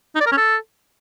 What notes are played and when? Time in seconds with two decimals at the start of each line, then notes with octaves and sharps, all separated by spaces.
0.15 D#4
0.21 D5
0.26 A#4
0.32 C#4
0.37 A4